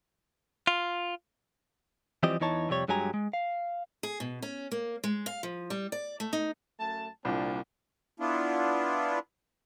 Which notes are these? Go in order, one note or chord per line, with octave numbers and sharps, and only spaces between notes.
F4
E3 F3 G3 C4 G4 D#5
E2 E3 D#4 C#5 A5
F2 C3 G3 C#5
G2 F#3 G#3 G4 G#5 A#5
G#3
F5
G#4
B2
C#4
A#3
G#3
F5
F3
G3
D5
A3
D#4
F#2 A3 A5
C2 A#2 A#3 C4 D4
B3 D4 E4 F4